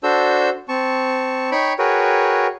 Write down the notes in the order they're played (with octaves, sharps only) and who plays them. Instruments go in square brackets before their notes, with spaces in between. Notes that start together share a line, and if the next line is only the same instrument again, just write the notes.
[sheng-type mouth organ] D4 F#4 A4 C5 E6 G6
C4 A5 C#6
D#4 C#5 G5 B5 C#6
F#4 G#4 A#4 B4 C#5 G5